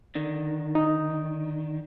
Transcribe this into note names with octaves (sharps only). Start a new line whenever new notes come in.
D3 D#3
D#4